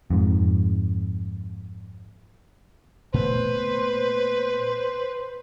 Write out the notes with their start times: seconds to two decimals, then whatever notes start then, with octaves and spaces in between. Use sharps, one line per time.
0.10 F2 G#2
3.14 A#2 A3 B3 B4 C5